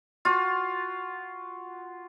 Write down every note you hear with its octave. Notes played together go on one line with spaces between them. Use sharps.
F4 F#4